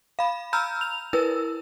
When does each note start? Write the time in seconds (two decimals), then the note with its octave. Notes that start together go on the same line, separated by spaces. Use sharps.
0.19 F5 B5
0.53 A#5 B5 E6 F6 G6
0.81 F7
1.13 E4 A#4 B4 E6